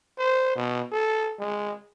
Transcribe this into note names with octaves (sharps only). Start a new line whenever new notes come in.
C5
B2
A4
G#3